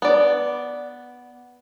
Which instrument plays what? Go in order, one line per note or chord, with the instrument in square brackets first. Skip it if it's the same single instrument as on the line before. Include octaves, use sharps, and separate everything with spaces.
[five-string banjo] B3 D5